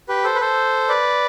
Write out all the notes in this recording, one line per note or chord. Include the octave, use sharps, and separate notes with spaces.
G4 B4
A4 C5
B4
A4 C5
B4 D5